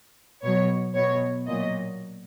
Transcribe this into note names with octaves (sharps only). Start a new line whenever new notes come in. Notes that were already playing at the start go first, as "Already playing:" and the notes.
B2 F#3 C#5
B2 F#3 C#5
A#2 F#3 D#5